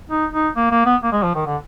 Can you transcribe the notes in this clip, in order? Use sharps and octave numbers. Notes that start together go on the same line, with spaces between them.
D#4
D#4
A#3
A#3
B3
A#3
G#3
F3
D#3
D3